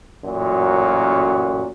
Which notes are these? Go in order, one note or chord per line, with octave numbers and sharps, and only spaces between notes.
A1 F#2 A#2 F#3 F#4